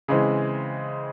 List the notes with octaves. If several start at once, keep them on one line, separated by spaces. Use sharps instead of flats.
C#3 E3 G#3 C4